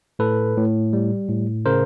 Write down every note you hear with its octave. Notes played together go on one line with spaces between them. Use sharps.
A2 A4 B4
A2
G3
A2
C#3 A#4 C5